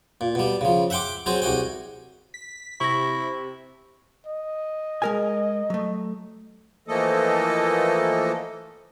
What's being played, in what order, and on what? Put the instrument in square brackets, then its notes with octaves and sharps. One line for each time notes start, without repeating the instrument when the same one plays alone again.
[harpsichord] A#2
B2 G3
C#3 F3
E5 F#5 G5 C6 D6
F#3 C4 G#4 C5
C2 F#4 G#4 G5
[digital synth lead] B6
[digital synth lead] C3 [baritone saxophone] E4 [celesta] C#6 A#6
[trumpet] D#5
[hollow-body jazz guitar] G#3 A#4 G#5
F#3 A3
[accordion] E3 F3 A3 A#3 A4 D#5